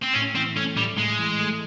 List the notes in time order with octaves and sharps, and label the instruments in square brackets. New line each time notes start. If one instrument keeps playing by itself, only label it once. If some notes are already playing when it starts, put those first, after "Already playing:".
[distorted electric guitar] C4
[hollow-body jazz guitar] A2 [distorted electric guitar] C#4
[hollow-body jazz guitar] E3 [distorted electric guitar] C4
[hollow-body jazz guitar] A3 [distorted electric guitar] C#4
[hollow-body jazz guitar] A2 [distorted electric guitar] G3
[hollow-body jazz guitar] A2 [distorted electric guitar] G#3
[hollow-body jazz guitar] E3
A3